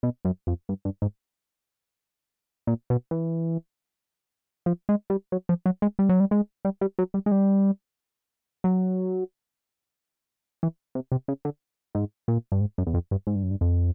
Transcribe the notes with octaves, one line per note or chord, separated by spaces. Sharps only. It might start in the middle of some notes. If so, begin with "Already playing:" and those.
B2
F#2
F2
G2
G2
G#2
A#2
B2
E3
F3
G#3
G3
F#3
F3
F#3
G#3
G3
F#3
G3
G#3
G3
G3
F#3
G3
G#3
G3
F#3
E3
C3
C3
C#3
D3
G#2
A#2
G2
G#2
F#2
E2
F2
G2
G#2
G2
F#2
G2
F2